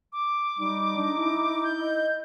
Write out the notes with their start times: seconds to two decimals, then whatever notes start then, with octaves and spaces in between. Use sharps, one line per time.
0.13 D6
0.59 G3 D#4
0.97 D4
1.17 E4
1.64 G6
1.80 D#5